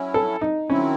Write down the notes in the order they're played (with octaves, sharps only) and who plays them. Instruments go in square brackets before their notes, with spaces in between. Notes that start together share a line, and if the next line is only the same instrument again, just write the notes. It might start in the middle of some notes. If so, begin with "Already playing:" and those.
Already playing: [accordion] F#3 C#4 E4
[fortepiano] A4
D#4
[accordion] D#3 F#3 C4 E4 [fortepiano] C#4